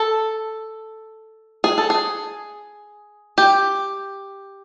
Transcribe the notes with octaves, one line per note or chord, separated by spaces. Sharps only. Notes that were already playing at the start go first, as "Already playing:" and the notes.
Already playing: A4
G#4
A4
G#4
G4